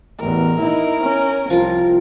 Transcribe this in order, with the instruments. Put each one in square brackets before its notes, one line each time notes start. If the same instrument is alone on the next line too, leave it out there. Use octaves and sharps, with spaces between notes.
[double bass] A1 E2 [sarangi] A#4
[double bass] D#4 E4
C#4
[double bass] C2 [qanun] F3 F4